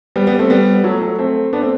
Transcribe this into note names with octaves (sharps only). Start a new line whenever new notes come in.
G3 B3
G3 B3
A3 C4
G3 B3
B3
F#3 A3
F#3 A3
A3 C4
B3 D4
A3 C4